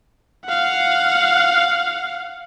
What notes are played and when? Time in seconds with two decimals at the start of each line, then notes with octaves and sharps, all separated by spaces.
0.45 F5 F#5